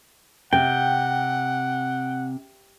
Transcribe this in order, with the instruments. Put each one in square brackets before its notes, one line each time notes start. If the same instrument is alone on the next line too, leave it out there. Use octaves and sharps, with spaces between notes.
[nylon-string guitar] C3 [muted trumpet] F#5 [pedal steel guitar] G5